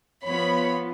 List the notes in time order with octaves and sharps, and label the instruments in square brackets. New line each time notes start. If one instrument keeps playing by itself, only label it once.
[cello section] F3 B3 F4 [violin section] C#5 B5